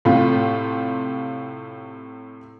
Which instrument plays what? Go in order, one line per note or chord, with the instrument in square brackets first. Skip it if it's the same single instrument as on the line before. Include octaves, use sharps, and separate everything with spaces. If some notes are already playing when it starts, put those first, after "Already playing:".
[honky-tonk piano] A2 C3 F4